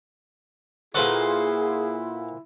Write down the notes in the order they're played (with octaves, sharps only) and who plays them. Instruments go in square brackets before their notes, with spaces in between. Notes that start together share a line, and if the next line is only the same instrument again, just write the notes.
[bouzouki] A#2 C5 F#5 [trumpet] E4 [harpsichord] F#4 A4 B4 [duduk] G#4